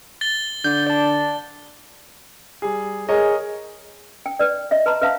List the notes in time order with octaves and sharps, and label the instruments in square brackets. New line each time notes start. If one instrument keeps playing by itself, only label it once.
[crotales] A6 G7
[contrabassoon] D3 [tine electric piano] G6
[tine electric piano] D5 A5
[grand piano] G3 G#4
[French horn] G#4 [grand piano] A#4 C#5 D#5
[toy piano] G5
B4 D5
D#5 E5
B4 A5 A#5 C6
B4 C5 E5 F5 A5